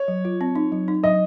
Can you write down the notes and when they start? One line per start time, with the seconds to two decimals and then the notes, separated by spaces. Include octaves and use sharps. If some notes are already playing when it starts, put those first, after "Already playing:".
Already playing: C#5
0.08 F#3
0.25 F4
0.41 C4
0.55 D#4
0.72 F#3
0.88 D#4
1.03 F#3 D#5